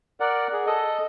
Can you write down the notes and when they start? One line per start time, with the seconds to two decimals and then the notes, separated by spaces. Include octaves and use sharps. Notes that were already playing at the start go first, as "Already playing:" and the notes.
0.20 A#4 D5 F#5
0.53 G#4
0.67 A4 D#5